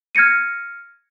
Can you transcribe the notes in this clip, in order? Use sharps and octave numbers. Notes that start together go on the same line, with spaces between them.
F6 G#6 A#6 C#7 D#7